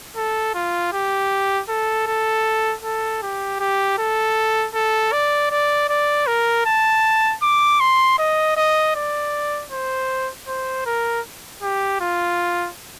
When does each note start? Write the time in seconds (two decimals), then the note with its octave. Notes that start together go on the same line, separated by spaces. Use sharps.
0.16 A4
0.54 F4
0.93 G4
1.69 A4
2.07 A4
2.83 A4
3.22 G4
3.60 G4
3.98 A4
4.75 A4
5.12 D5
5.51 D5
5.89 D5
6.27 A#4
6.66 A5
7.42 D6
7.80 C6
8.18 D#5
8.57 D#5
8.95 D5
9.72 C5
10.47 C5
10.86 A#4
11.62 G4
12.00 F4